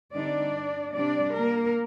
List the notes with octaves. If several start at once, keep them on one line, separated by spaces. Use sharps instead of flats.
G2 D3 G3 C4 D4 D#4 D5
C3 G3 C4 D4 D5
A#3 A#4